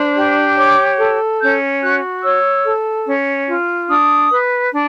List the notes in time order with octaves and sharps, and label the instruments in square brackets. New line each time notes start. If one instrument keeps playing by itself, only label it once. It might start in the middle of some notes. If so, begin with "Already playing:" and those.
Already playing: [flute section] D4 C5
G4
C#5 D6
A4
C#4 G6
F#4 F#6
C#5 E6
A4
C#4
F4
D4 D#6
B4
D4